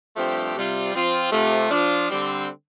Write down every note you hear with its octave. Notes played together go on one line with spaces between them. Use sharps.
G2 F3 A3 C4 G4
C3 G3 F4
F3 C4 F4
C3 A3 F4
F3 D4 F4
D3 G3 C4